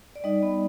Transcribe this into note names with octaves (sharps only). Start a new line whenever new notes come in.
D5
G3 D#4 D#5
B3